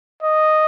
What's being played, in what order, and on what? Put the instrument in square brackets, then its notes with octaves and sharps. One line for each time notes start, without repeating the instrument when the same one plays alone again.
[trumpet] D#5